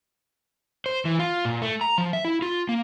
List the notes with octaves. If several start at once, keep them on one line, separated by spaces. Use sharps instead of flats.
C5
E3
F4
A#2
A3
A#5
F3
E5
E4
F4
A#3